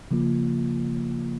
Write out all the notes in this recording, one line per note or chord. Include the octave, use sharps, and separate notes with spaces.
C#3 F3 A#3 F4